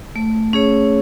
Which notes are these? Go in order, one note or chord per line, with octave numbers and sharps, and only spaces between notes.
A3
C#4 G#4 C#5